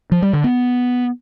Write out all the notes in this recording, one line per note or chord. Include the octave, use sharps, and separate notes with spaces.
F3
G3
D3
B3